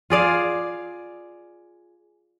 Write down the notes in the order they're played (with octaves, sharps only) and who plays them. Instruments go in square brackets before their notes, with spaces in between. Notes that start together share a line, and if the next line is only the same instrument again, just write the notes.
[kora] F4 G#4 D5 F5